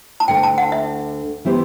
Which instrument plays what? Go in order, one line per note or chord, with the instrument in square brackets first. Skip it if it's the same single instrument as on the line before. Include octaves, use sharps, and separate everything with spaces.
[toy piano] A5
[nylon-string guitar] D2 D3 A3 [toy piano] G5
[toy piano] A5
F#5
E5
[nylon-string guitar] E3 B3 E4 G4 C5